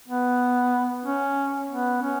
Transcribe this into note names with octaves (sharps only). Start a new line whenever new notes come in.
B3
C#4
B3
C#4